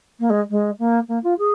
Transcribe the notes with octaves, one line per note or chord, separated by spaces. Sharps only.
A#3
G#3
G#3
A#3
A#3
F4
G#4